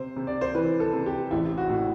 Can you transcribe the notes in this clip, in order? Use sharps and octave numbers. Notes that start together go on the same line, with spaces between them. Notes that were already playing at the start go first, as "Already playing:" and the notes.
Already playing: C3 C5
C3
D5
C5
E3 B4
A4
C3
G4
A1 E4
F#4
A2